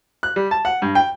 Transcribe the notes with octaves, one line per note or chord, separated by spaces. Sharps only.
F#6
G3
A5
F#5
G2
G5